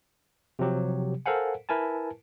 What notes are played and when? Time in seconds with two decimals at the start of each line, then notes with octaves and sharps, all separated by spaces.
0.59 C3 F3 F#3 G4
1.26 A4 A#4 C5 F5 F#5 G#5
1.69 E4 A#4 B4 G#5 A5